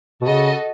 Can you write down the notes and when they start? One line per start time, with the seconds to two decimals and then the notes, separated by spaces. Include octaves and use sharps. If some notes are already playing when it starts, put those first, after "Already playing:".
0.21 B2
0.27 C#3 F#4 A4 D#5